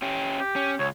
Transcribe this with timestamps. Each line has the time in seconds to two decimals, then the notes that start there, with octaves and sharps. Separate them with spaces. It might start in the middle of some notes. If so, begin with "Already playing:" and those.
0.02 C#4 G4
0.40 G4
0.56 C#4
0.79 C#2 C#5